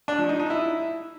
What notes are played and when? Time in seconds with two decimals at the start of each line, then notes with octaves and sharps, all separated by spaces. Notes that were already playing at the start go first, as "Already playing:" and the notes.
0.08 D4
0.19 F3
0.29 D#4
0.40 D#4
0.50 E4